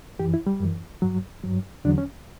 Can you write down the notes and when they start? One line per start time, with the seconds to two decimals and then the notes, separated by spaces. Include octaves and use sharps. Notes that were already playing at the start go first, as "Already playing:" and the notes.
0.19 F#2 E3 G4
0.34 E4
0.47 G3
0.60 F#2 E3
1.02 G2 F#3
1.44 G2 F#3
1.85 E2 D3 F#3 D4
1.98 C#4